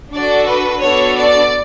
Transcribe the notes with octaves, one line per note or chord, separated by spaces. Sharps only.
D4 F#4 A4 D5
B4
B3 D4 F#4 A4 C#5
D5